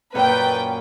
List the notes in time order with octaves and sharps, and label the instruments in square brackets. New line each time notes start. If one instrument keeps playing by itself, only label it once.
[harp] F#2 A#2 C#4 [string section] B4 G5